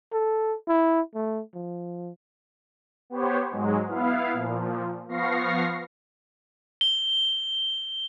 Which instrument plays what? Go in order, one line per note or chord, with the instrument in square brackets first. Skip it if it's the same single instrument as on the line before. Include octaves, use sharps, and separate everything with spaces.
[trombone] A4
E4
A3
F3
[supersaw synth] B3 G4 C5 C#5
G#2 F#3 G#3
B3 E4 F5
A#2 F3
F3 B3 F5 C#6 A#6 C7
[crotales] G7